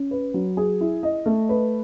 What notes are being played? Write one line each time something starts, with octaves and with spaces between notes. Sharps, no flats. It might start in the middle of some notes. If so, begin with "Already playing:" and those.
Already playing: C#4
B4
F#3
G#4
E4
D#5
A3
B4